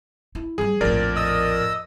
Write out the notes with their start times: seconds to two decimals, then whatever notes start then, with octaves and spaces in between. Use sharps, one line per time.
0.35 E4
0.58 F#3 G3 G#4
0.81 A#1 F2 A2 A#4 D5
1.16 D#5 D#6 E6